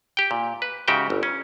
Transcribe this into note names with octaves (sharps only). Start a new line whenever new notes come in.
G4 G5
A#2
B4
G#2 C#3 F#4 G4 E5 G5
G1
C#4